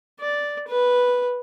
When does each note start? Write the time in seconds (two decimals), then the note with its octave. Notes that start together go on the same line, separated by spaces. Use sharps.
0.20 D5
0.68 B4